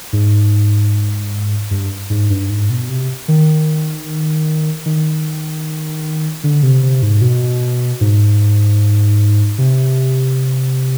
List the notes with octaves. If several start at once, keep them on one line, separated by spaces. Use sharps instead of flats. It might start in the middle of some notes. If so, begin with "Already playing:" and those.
G#2
G2
G#2
G2
G#2
B2
C3
D#3
D#3
D3
C3
C3
G#2
B2
G#2
C3